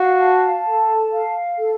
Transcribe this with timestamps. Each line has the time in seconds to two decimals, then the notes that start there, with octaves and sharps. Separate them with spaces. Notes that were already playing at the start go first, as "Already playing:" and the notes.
Already playing: F#4 F5
0.21 A5
0.67 A4
1.13 F5
1.58 A4